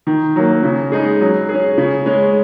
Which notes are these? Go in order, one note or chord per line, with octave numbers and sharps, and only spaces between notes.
D#3
F#3 A#3
C#3
G#3 D#4 G#4
F#3
C#4 G#4
C#3
G#3 C#4